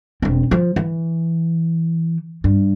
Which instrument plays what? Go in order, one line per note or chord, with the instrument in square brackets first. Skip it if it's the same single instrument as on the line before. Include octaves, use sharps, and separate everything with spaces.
[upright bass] E1 C4
F3
E3
G2